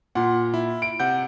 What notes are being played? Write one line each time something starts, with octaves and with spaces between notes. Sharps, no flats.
A#2 F#5 C6
E4
D7
C3 F#5 G6